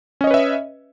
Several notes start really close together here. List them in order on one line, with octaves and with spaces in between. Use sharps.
C#4 D#5 C#5 B4 E5